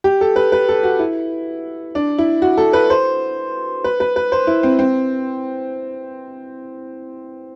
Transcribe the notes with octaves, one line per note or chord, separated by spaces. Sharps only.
G4
A4
B4
B4
A4
F#4
E4
D4
E4
F#4
A4
B4
C5
B4
B4
B4
C5
E4
C4
C4